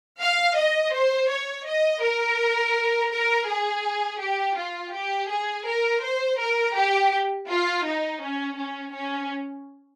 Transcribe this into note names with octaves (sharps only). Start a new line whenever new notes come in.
F5
D#5
C5
C#5
D#5
A#4
A#4
G#4
G4
F4
G4
G#4
A#4
C5
A#4
G4
F4
D#4
C#4
C#4
C#4